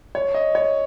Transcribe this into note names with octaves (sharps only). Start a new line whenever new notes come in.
C#5
D#5
C#5